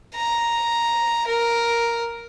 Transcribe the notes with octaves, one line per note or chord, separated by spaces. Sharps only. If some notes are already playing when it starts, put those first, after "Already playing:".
A#5
A#4